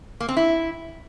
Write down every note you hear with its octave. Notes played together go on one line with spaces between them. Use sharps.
A#3
C4
E4